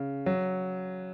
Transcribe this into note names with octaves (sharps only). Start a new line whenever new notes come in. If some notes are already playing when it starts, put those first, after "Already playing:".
Already playing: C#3
F#3